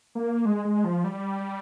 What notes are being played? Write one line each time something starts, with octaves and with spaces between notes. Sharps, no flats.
A#3
G#3
G#3
F3
G3